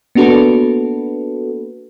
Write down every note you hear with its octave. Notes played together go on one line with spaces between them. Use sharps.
A#3 B3 D4 F#4 A4 B4